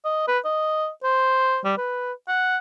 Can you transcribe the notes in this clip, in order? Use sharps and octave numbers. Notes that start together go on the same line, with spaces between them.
D#5
B4
D#5
C5
G3
B4
F#5